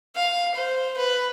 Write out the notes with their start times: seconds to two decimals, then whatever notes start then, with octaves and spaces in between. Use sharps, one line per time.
0.16 F5
0.54 C5
0.97 B4